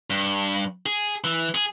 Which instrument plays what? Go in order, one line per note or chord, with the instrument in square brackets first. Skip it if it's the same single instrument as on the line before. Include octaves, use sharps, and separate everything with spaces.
[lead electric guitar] G2
G#4
E3
G#4